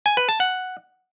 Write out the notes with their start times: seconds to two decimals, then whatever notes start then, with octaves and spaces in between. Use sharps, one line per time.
0.06 G#5
0.17 B4
0.29 A5
0.40 F#5